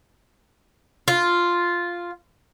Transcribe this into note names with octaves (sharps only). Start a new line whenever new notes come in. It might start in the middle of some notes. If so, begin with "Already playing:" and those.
F4